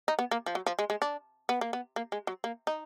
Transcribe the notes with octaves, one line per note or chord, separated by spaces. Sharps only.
D#4
B3
A#3
F3
F#3
F3
G#3
G#3
D4
B3
A#3
B3
A#3
G#3
F#3
A#3
D#4